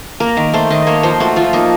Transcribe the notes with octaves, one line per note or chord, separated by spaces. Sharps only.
A#3 A#4
D#3
A3 C5
D#3 D#5
A#3 C#5
F3 C5
A3 F#4
F3 F4
A#3 D#4